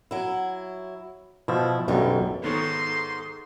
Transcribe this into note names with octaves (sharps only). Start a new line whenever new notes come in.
F#3 E4
B2 F3 E4
B1 F#2 D3 G3
G#2 D#3 B3 A4 C#5 C6